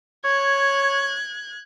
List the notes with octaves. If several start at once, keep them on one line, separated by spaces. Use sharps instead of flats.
C#5 F#6 G#6